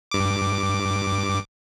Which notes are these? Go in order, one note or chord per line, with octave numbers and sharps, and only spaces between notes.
G2 D6